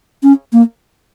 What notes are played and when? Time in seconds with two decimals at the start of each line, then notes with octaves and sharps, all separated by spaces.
0.23 C#4
0.53 A#3